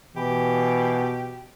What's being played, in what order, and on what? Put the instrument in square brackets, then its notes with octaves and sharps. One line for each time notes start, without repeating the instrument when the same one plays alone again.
[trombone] B2 [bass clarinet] E3 [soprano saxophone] G4